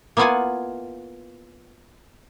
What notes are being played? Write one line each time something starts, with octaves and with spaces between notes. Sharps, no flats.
A#3 B3 E4 F4 F#5 G#5